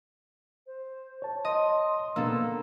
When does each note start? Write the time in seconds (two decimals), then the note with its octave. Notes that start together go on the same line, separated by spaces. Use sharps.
0.67 C5
1.22 C#5 A5
1.45 D#5 C6
2.16 B2 A#3 B3 D4 A4 E6